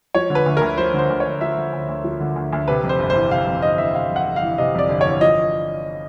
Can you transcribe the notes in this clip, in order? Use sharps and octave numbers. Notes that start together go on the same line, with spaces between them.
F3 C#5
D3
B4
D2
D2 A#4
F3 C5
D3 C5
D2
C#5
D2
F3 E5
D3
D2
D2
F3
D3
D2
D2
C3 B4
F2
C5
G1
C5
E3
C3 F5
F2
G1 D#5
E3 E5
C3 F5
F2 F#5
G1
F5
E3
C3 D#5
F2 D5
G1
E3 C#5
F3 D#5